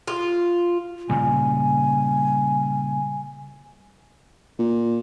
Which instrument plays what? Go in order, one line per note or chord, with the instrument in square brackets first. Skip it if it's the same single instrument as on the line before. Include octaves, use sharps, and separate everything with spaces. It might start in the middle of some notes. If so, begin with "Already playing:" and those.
[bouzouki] F4
[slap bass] A#2 C#3 G3 [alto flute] G#5
[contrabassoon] A#2